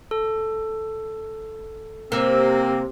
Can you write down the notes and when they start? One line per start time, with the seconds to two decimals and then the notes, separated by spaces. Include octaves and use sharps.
0.11 A4
2.12 C3 A#3 C4 A#4 E6